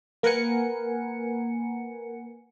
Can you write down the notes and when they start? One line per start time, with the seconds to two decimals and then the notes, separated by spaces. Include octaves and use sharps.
0.23 A#3 A#4 B4 F#5 G#5 C#7